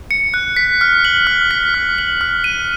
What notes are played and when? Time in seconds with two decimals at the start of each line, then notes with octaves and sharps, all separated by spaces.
0.11 C#7
0.34 F#6
0.57 B6
0.81 F6
1.05 F#7
1.27 F6
1.51 B6
1.74 F6
1.98 F#7
2.21 F6
2.44 D#7